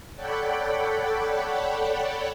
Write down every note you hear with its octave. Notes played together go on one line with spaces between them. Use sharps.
A4 C#5 D5 F#5 G5 B5